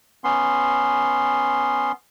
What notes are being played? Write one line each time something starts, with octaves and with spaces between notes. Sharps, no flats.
B3 C#4 C6